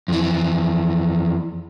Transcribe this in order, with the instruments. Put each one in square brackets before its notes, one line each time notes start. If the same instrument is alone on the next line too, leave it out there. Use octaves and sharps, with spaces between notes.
[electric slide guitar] F2 E3